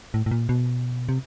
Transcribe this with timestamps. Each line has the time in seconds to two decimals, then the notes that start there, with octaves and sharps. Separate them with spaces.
0.14 A2
0.26 A2
0.31 A#2
0.49 B2
1.09 C3